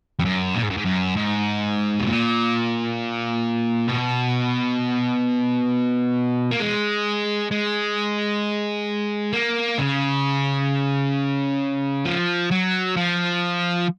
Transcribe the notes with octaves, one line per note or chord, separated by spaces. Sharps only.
F2
F#2
A#2
G#2
F#2
G#2
F#2
G#2
B2
A#2
B2
A#3
G#3
G#3
A#3
C#3
F3
F#3
F3